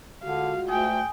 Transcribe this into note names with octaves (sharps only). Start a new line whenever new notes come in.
D3 G#3 F4 F#4 F5
D2 G#4 G5